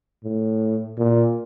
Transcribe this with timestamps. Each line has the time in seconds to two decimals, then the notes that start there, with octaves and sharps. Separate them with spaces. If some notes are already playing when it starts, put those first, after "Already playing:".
0.24 A2
0.98 A#2